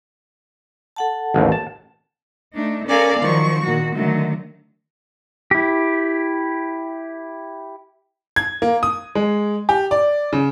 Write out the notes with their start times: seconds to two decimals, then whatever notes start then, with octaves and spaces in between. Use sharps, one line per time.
0.96 A4 F#5 A5
1.34 A1 D#2
1.52 A5
2.53 A3 D4 D#4
2.88 C#4 A4 A#4 D5 F5 G#5
3.19 D#3 F3 F#3 C#6
3.64 A#2 D#3 F#4
3.95 D3 D#3 F#3 A3
5.51 E4 G4
8.36 G#6
8.62 A#3
8.83 D#6
9.15 G#3
9.69 G4
9.91 D5
10.33 C#3